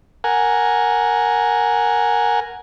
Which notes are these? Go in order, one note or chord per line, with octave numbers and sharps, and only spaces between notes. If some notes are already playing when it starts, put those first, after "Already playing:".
A#4 F#5 G#5